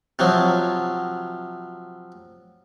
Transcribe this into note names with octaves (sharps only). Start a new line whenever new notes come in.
C3 F3 F#3